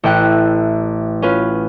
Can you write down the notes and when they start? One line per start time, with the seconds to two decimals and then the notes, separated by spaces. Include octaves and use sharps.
0.04 A1 E5 G5 F#6
1.22 C#4 F4 B4